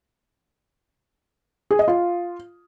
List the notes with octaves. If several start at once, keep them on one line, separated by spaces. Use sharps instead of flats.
G#4
D#5
F4